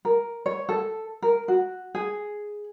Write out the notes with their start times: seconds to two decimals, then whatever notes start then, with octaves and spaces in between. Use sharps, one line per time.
0.05 A#4
0.46 C#5
0.69 A4
1.22 A#4
1.48 F#4
1.95 G#4